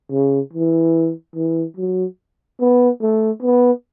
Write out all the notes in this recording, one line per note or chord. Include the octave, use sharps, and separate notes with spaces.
C#3
E3
E3
F#3
B3
A3
B3